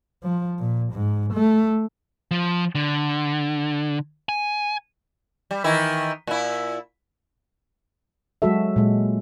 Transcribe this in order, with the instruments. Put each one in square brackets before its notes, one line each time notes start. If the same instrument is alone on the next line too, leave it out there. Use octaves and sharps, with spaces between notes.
[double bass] F3
A#2
G#2
A3
[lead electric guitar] F3
D3
G#5
[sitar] G3
D#3 E3 E4
A#2 E4
[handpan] F#3 G#3 F#4 A4 E5
A#2 G#3